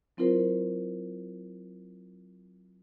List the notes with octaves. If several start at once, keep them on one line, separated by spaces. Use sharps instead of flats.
F#3 C4 E4 F4 A#4 C5